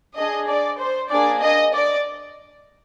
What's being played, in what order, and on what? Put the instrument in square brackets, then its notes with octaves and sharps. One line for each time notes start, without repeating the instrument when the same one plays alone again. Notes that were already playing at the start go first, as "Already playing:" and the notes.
[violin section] D4 G#4 D#5
D5
C5
A#3 D4 G#4 D5
D#5
D5